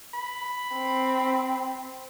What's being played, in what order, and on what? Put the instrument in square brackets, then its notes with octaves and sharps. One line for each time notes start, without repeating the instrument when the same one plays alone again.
[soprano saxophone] B5
[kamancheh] C4